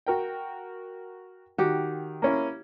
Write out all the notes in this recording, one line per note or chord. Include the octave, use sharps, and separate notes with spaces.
F#4 A#4 G5
D#3 F#4 G4
A#3 C#4 E4